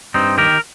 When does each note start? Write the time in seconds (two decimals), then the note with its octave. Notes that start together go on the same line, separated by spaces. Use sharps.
0.14 G2 C4 D#4
0.37 D#3 G4 A#4